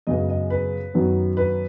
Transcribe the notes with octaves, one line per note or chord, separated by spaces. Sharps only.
F#2 C#3 G#3 B3 D#5
D#5
B4
F#2 D#3 F#3 B3
B4